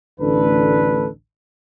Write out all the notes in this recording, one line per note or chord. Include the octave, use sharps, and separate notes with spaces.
A1 D2 D3 D4 A4 B4